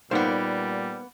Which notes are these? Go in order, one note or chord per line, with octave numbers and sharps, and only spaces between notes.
A#2 G3 A#3 B3 D#4 C5